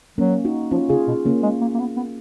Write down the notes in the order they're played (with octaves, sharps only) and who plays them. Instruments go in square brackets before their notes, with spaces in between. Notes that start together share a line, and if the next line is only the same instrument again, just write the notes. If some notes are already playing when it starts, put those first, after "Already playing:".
[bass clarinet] F#3 [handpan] A#3 C#4
[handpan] D#4 F#4
[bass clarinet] F3 [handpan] C#4 F4
[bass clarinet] C#3 [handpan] F4 G#4
[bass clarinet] B2
[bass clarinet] C#3 [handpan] A#3 C#4
[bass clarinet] G#3
A#3
A#3
B3
B3